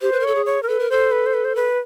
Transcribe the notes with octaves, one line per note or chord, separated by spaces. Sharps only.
G4 C5
B4
A#4
A4 C#5
G#4
C#5
A#4
A4 B4
A#4
A4 C5
B4
C5
B4
C5
B4